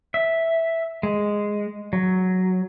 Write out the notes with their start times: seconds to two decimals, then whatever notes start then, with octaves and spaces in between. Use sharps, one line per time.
0.14 E5
1.03 G#3
1.93 F#3